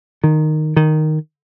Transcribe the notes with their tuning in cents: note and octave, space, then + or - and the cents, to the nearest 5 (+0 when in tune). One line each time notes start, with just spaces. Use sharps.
D#3 -10
D#3 -5